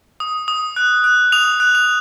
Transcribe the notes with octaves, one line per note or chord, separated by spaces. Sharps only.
D#6
D#6
F#6
F#6
D#6 F7
F#6
F7